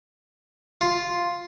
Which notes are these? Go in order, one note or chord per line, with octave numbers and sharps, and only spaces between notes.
F4